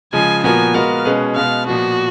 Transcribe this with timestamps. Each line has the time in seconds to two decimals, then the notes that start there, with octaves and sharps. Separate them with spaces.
0.13 C#3 F3 G#3 G#5
0.43 A#2 F3 B3 F#4 A#4 G#5
0.74 G#3 B3 F#4 A#4 F5
1.05 B2 G#3 C#4 G#4 B4
1.36 B2 G#3 B3 F5
1.66 A#2 F3 B3 F#4